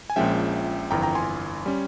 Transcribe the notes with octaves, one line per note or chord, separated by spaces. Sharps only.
G#5
A#1 A#2 F3 G#3 C#4 E5 G5
G1 F2 E3 G5 A#5
G5 A#5
G#5 C6
G3 C#4